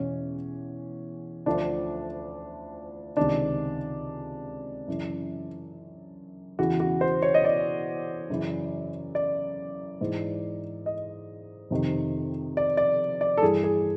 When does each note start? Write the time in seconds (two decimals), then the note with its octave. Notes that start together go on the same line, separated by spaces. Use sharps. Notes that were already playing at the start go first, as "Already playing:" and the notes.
Already playing: E2 B2 C#4
1.46 D2 D3 F3 D4
3.17 C#2 C3 D#3 D4
4.88 F#2 C#3 E3
6.59 E2 C#3 E3 F#4
6.80 F#4
7.01 C5
7.22 C#5
7.34 D#5
7.44 D5
8.30 F#2 C#3 E3
9.15 D5
10.01 G#2 E3
10.86 D#5
11.71 F2 C3 D#3
12.57 D5
12.77 D5
13.21 D5
13.37 A4
13.41 G2 E3 G#4
13.64 G#4